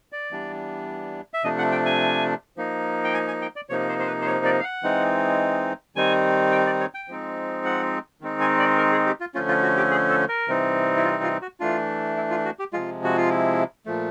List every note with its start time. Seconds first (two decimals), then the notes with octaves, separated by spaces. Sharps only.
0.12 D5
0.31 E3 G3 B3 D4
1.34 E5
1.44 C3 F3 A3 D4 D#5
1.58 F#5
1.72 G5
1.86 G#5
2.57 F3 A#3 D#4
3.04 G5
3.14 G#5
3.27 G#5
3.42 G5
3.56 D5
3.69 C3 F3 A#3 D#4 C#5
3.89 C5
3.99 C5
4.07 B4
4.21 C5
4.26 C#5
4.45 D5
4.60 F5
4.64 F#5
4.83 E3 G#3 C4 D#4
5.96 D#3 G3 C4 D#4 G#5
6.52 G5
6.66 D5
6.80 C#5
6.94 G5
7.08 F3 G#3 C4 D#4
7.65 F#5
8.21 D#3 G#3 C4 D#4
8.40 G#5
8.59 D5
8.78 A#4
8.92 G#4
9.07 G4
9.20 F4
9.34 D3 F3 A3 C#4 F4
9.48 F4
9.63 F#4
9.77 G4
9.91 G#4
10.10 A4
10.29 A#4
10.48 C3 E3 G3 C4 D#4
10.97 E4
11.04 F4
11.23 F4
11.42 F#4
11.60 E3 A3 D4 F4
12.17 E4
12.31 F4
12.45 F#4
12.59 G4
12.73 C3 F3 G#3 F4
13.04 F#4
13.17 F4
13.30 E4
13.86 A#2 F3 A3